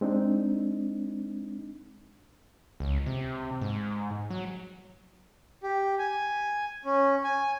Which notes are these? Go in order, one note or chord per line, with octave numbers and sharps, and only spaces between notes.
G#3 C4 D4 D#4
C#2
C3
G#2
F#3
G4
G#5
C#4
G#5